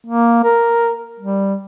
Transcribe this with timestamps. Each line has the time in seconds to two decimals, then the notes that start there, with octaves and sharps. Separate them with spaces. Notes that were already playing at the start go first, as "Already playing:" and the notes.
0.06 A#3
0.44 A#4
1.20 G3